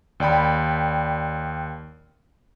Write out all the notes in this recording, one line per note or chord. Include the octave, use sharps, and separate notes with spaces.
D#2 D5 G5 B5